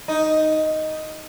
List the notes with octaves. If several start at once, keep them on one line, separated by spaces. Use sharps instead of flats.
D#4